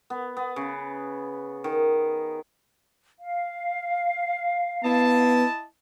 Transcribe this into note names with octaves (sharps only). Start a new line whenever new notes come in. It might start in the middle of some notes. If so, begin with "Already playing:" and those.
B3
B3
C#3
D#3
F5
B3 E4 D#5 A5